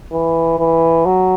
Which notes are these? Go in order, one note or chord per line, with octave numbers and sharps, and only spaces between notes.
E3
E3
F#3